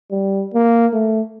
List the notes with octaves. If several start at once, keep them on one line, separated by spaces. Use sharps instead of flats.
G3
A#3
A3